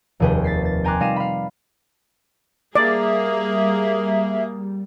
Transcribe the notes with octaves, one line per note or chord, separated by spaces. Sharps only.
F1 D#2 F3 G#4 B4 G5
A6 B6 C7
A6
G5 G#5 A#5 C6 D6 F#6
G3 D#4 F5 A#6 D#7 E7
F5 B5
G3 A#3 G#4 D5 E5